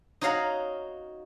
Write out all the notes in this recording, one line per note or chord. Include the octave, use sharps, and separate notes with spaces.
D#4 F#4 C#5 F5 F#5 A#5